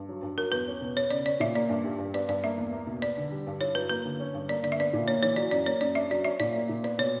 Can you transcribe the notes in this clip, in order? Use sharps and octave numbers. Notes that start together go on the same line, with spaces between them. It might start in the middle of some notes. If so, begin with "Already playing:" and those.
Already playing: G2
F#3
G2
F#3 A#4
E2 B4
C#4
B2
B3 C#5
C#3 D5
C#4 D5
A#2 E5
A#3 D5
G2
G3
G2
B3 D5
G2 D5
A#3 E5
E2
A#3
B2
B3 D5
D3
G3
G2
E4 C#5
F#3 B4
A#3 B4
D3
C#4
G2
A#3 D5
D3 D5
E5
B3 D5
A#2
A#3 C#5
E3 C#5
F#3 D5
F#2 D5
A#3 C#5
F#2 D5
D4 E5
F#3 D5
C#4 E5
A#2 D5
A#3
A#2
B3 D5
B2 C#5